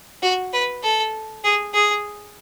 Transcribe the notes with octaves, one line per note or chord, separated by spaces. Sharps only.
F#4
B4
A4
G#4
G#4